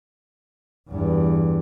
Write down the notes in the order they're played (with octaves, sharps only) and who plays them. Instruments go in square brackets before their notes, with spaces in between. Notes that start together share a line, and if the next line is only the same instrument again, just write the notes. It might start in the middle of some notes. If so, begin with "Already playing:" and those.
[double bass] E2 G2